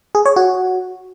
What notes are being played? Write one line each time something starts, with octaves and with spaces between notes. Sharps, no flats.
G#4
C#5
F#4